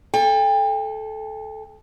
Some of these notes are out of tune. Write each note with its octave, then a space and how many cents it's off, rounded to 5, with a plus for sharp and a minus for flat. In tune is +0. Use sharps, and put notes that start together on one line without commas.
A4 -15 G5 +35